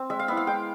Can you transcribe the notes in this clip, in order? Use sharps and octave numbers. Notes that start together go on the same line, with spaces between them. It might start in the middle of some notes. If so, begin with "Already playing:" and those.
Already playing: C4
G#3 E5
F5
B3 E4 E5
F5
G#3 G5